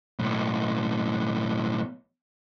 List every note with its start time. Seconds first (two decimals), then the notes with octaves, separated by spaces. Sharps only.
0.19 B1 A2